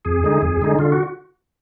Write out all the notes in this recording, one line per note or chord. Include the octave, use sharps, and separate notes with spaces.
F2 G#4
D3 G#3 D#4
F2
D3 G#3 D#4
D3 F4
F#4